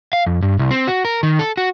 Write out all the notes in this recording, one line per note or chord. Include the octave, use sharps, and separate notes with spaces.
F5
F2
G2
C2
C4
F#4
A#4
D#3
A4
F#4